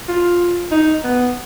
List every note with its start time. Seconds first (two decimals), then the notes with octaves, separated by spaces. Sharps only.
0.08 F4
0.71 D#4
1.04 B3